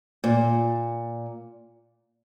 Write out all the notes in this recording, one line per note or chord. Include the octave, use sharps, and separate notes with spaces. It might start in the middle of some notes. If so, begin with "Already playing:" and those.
A#2